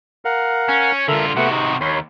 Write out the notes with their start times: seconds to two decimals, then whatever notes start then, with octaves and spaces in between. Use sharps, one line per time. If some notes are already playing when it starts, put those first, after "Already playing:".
0.25 A#4 F5 F#5
0.69 C#4
1.08 D3 F4 A4 A#4 E5
1.36 C3 A3 B3 F#4 F#5
1.50 D#4
1.81 D#2 C#5 B5 C6